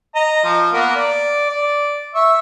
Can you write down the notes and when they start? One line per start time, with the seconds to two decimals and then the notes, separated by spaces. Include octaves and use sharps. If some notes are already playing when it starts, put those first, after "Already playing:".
0.15 D#5 A#5
0.44 F3
0.73 A#3 B3 A#4
0.95 D5
1.50 D5
2.15 E5 C#6